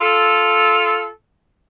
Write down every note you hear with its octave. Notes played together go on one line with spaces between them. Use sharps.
F4 A4